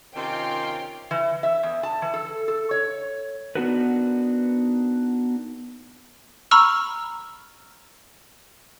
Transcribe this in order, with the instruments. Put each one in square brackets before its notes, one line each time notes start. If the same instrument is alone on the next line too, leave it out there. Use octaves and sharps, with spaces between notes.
[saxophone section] C3 D#3 F4 [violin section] C#4 G5 C6
[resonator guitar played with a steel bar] E3
E5
E2
A5
E3
A4
A4
C#5
[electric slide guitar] B3 D4 D#4 F#4 A#4 B4
[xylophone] A#5 B5 C#6 E6 F6